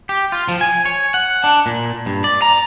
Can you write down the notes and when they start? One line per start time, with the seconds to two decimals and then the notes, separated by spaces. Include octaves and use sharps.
0.09 G4
0.32 F4
0.49 F3
0.61 G#5
0.86 C#5
1.14 F#5
1.44 D4
1.66 A#2
2.06 G2
2.24 D5
2.42 A#5